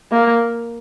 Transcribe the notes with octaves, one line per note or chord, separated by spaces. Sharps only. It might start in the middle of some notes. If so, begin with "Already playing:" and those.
A#3